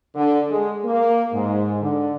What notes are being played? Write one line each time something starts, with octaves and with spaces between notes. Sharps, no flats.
D3
G#3
A#3
G#2
D3